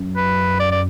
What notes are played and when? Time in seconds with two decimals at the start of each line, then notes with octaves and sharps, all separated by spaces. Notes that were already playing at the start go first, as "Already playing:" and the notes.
Already playing: F#2
0.16 B4
0.60 D5
0.72 D5